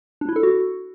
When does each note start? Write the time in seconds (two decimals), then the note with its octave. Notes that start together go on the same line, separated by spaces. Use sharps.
0.21 D4
0.29 E4
0.36 A4
0.43 F#4